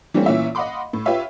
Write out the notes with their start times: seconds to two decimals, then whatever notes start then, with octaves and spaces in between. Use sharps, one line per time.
0.14 E3 G3 A3 A#3 C4 C#4
0.26 A#2 E3 C#4 F4 E5
0.55 D#5 F5 F#5 B5 C6 D6
0.93 A2
1.06 F4 G4 B4 C#5 E5 F5